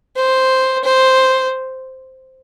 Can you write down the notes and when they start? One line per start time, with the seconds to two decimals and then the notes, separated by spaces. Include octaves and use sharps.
0.16 C5
0.84 C5